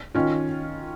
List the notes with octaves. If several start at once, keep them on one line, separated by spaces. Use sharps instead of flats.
D#3 C#4 F4